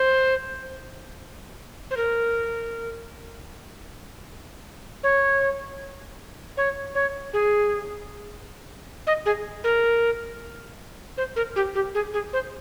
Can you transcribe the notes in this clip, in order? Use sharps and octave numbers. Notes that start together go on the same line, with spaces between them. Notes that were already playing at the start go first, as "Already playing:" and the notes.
Already playing: C5
C5
A#4
C#5
C#5
C#5
G#4
D#5
G#4
A#4
C5
A#4
G4
G4
G#4
G#4
C5